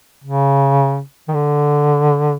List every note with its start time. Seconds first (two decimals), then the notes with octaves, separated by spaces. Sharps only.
0.24 C#3
1.28 D#3
1.34 D3